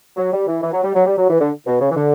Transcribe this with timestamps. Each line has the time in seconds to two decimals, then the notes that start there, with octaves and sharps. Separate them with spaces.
0.17 F#3
0.33 G3
0.47 E3
0.62 E3
0.73 F#3
0.84 G3
0.95 F#3
1.06 G3
1.17 F#3
1.29 E3
1.40 D3
1.66 B2
1.80 C#3
1.91 E3
1.96 D3